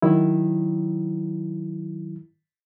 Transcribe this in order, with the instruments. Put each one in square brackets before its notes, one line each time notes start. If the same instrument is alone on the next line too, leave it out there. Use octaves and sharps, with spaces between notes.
[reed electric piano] D#3 F#3 E4